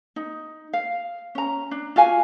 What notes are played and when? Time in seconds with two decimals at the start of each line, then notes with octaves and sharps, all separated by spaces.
0.16 D#4
0.73 F5
1.35 C#4 A#5
1.71 D4
1.96 F4 F#4 F5 G#5